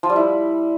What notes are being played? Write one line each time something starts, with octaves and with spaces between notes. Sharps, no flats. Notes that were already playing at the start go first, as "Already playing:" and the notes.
F3
G3
E4